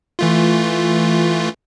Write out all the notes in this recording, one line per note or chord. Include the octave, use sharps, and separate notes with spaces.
E3 A3 F4